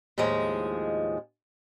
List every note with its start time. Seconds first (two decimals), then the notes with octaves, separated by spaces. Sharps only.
0.18 D#2 A2 F3 G#3 G#4